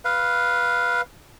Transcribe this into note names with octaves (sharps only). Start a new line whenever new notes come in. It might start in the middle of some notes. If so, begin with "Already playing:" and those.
B4 F5